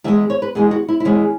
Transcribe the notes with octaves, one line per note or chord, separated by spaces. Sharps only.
E2 E3 G#3 E5
C#5
B4
E2 E3 G#3 G#4
F#4
E4
E4
E2 E3 G#3 C#4